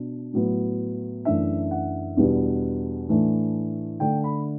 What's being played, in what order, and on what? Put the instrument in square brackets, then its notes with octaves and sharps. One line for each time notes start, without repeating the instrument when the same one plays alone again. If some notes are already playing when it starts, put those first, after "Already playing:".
Already playing: [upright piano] B2 D4
A2 F#3 B3
F#2 E3 A3 D4 E5
F#5
E2 B2 G3 B3 D4
A2 E3 A3 D4
D3 A3 D4 G5
B5